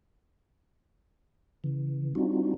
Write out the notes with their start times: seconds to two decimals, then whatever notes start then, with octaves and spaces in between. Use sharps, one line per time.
1.64 C#3 E3
2.15 G3 C4 D4 D#4 F4 F#4